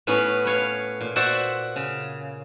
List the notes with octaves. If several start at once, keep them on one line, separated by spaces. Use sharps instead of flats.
A2 B3 C#4 B4 B5
B4 C#5 F5
A#2
F#4 C5 D5 E5 F#5
C#3